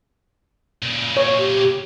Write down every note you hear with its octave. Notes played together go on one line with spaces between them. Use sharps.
A#2 C#3
C#5
G4